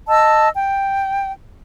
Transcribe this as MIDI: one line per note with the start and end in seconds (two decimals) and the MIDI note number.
0.07 0.49 75
0.07 0.49 81
0.07 0.49 88
0.56 1.31 79